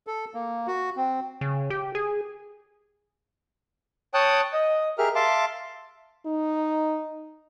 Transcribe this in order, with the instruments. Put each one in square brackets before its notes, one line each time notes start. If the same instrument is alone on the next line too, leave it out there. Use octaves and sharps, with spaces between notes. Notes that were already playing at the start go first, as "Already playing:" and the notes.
[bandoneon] A4
A#3
F#4
C4
[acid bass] C#3
G4
G#4
[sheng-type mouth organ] C#5 G5 A5 D#6 F#6
D#5
G4 G#4 A#4 E5 F6
E5 F5 A5 C6 D6
[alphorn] D#4